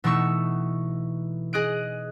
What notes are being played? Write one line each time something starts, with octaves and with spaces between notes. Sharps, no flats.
B2 E3 A3 D#4 C#6 E6
G#4 D#5 F#6 D7